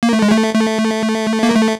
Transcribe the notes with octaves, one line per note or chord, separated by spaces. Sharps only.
A#3
A3
G#3
A3
A3
A#3
A3